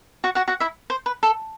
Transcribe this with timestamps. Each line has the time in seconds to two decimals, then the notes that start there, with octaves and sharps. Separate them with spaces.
0.24 F#4 F#5
0.35 F#4 F#5
0.48 F#4 F#5
0.60 E4 E5
0.90 C5
1.06 B4
1.23 A4